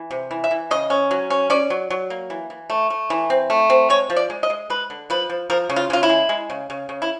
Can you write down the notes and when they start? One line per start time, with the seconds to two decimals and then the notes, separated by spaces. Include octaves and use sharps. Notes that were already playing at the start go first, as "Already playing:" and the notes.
Already playing: E3
0.11 C3
0.31 E3
0.44 E5
0.51 E3
0.71 C#3 D#5
0.90 C#4
1.11 F#3
1.30 C#4
1.50 C#4 D5
1.70 F#3
1.90 F#3
2.10 A#3
2.30 E3
2.50 E3
2.70 A3
2.90 A3
3.10 E3
3.30 C4
3.50 A3
3.70 C4
3.90 G#3 C#5
4.10 F3
4.16 D5
4.30 G#3
4.43 D#5
4.50 G#3
4.70 G#3 B4
4.90 D3
5.10 F3 B4
5.29 F3
5.50 F3 A#4
5.70 C#3
5.76 F4
5.90 C#3 F4
6.03 E4
6.09 G#3
6.29 G#3
6.50 C#3
6.70 C#3
6.89 C#3
7.02 E4